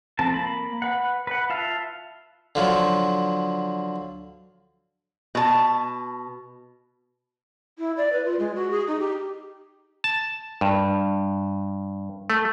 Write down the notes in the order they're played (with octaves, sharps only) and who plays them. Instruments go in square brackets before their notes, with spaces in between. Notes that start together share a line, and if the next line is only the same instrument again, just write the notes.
[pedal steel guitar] F3 C4 A4 A5
A#3 B5
B4 F#5
B4 F#5
F4 E5 F5 A5
[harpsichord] D3 F3 F#3
[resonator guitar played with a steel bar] B2 A5
[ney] E4
D5
B4
F4
G#3
F#4
G#4
D#4
G4
[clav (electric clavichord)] A5
G2
A3